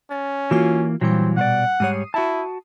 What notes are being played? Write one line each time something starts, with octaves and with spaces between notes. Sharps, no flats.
C#4 A6
E3 A#3 F4 F#4
A#2 E3 F#3 G3 C4
B2 C5 D5 F#5
G#2 G3 C#5 D#6 C7 D#7
E4 F#4 A5